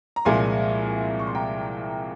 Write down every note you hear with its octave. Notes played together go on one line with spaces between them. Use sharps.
A#5
C2 A#2 F3 G#3 G#5 C6
C#6
C6
G5 A#5